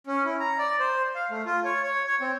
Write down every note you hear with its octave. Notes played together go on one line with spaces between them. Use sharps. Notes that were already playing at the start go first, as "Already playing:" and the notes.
C#4
E4
A#5
D5
C5
F5
A3
F4
C#5
C#5
C#5
C4